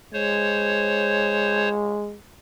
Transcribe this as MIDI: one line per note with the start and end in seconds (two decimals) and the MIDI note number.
0.13 2.15 56
0.13 1.69 72
0.13 1.69 73